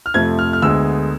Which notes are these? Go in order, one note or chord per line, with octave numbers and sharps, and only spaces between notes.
F6
F2 C3 F3 A3 G#6
F6
F6
D2 D3 G#3 B3 E6